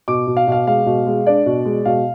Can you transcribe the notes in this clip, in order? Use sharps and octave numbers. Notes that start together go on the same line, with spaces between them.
B2 D6
B2
F5
B2 F5
G#3 F5
B2
G#3
D4 D5
B2
G#3
B2 F5